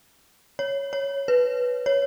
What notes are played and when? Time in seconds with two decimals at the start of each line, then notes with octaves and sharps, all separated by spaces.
0.59 C#5
0.93 C#5
1.28 B4
1.86 C#5